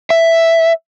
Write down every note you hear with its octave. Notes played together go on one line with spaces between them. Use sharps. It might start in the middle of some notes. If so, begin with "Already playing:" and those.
E5